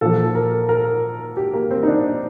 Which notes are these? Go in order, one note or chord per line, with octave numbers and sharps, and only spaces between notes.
A#2 F3 A4
A#4
A#4
G4
A#3
C4
D#4
D4